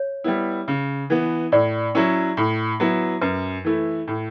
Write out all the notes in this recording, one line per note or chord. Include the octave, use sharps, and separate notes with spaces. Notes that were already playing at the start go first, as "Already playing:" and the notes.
Already playing: C#5
G3 B3 E4
C#3
E3 B3
A2 D5
F#3 C#4 E4
A2
F#3 B3 E4
F#2 B4
E3 A3 E4
A2